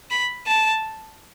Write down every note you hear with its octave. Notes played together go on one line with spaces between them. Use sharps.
B5
A5